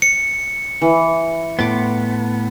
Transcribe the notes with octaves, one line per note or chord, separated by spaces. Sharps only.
C#7
E3
A2 B3 C6 D6